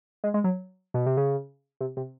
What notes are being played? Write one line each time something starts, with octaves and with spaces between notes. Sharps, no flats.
G#3
G#3
F#3
B2
C3
C#3
C3
C3